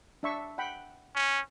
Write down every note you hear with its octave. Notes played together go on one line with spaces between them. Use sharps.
D4 E5 C#6
F#5 G5 B5
C#4